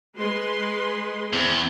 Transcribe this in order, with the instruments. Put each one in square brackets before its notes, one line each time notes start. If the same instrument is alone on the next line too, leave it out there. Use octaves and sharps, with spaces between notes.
[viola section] G#3 B4 C6
[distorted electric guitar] E2 [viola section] C4